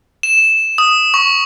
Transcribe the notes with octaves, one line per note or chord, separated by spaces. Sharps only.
E7
D#6
C#6